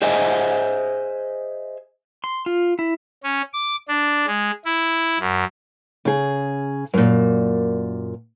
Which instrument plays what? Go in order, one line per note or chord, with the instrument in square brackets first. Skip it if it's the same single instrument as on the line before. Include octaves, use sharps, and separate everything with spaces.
[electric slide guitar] G#4 C5 D#5 E5 G#5
[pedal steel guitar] C6
F4
E4
[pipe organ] C#4
D6
D4
G#3
E4
F#2
[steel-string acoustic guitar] C#3 G#4
F#2 A#2